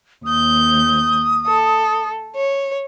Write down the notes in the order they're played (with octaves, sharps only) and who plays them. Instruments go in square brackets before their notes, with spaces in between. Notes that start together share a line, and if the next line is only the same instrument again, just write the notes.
[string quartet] D#2 G6 [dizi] D#6
[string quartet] A4
C#5